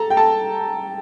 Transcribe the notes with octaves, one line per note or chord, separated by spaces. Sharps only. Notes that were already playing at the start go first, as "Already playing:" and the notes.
Already playing: A4 A5 A#5
G5
A4 A5